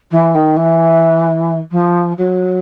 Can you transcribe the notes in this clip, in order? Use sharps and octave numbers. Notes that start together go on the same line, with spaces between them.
E3
D#3
E3
F3
F#3